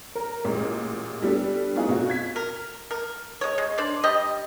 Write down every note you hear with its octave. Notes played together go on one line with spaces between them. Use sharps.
A#4
A1 A#2 G#3
G3 B3 D4 A4
A3 B3 D4 D#4 F4 G#4
B2 C4 F4 F#4
G#6 B6
A#4
A#4
G#3 C#5
G#3
D4 C5 D5
G3 D#5